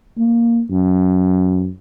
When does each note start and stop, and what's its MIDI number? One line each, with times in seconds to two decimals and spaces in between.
0.18 0.62 58
0.71 1.70 42